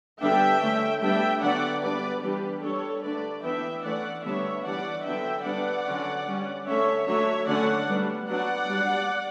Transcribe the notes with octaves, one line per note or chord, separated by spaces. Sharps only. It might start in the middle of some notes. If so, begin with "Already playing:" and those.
D3 G3 B3 D4 E5 G5
D3 A3 C#4
G3 B3 D4 E5 G5
D3 F#3 B3 D4 D5 F#5
G3 B3 D4 B4 D5
E3 G3 D4 G4 B4
G3 D4 A4 C#5
D3 A3 D4 B4 D5
E3 B3 D4 E5 G5
E3 A3 C#4 D5 F#5
D3 G3 B3 D4 C#5 E5
E3 G3 D4 D5 F#5
D3 F#3 B3 D4 E5 G5
G3 B3 D4 D5 F#5
D3 F#3 C#4
G3 C#4
D3 A3 C#4 C#5 E5
F#3 A3 D4 C#5 E5
D3 F#3 A3 C#4 D5 F#5
G3 B3 D4
F#3 B3 D4 D5 F#5
G3 D4